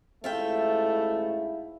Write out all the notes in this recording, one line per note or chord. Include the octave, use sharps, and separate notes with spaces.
A1 G#2 A3 E4 F4 E5 G5